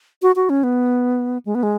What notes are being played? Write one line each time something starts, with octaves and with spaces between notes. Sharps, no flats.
F#4
F#4
C#4
B3
G#3
B3
G#3